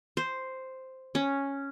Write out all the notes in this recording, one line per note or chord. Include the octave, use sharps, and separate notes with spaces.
C5
C#4